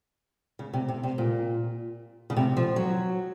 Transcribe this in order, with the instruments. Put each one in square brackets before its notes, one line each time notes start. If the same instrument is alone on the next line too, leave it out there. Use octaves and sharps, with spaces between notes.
[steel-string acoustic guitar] C#3
C3
C3
C3
A#2
C#3
C3
F3
F#3